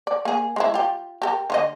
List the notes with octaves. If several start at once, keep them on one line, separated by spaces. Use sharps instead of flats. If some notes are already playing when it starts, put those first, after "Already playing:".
D5
A#3 G#4
G#3 D#4 E4
F4 G4
G4 A4 A#4
D3 F4 D#5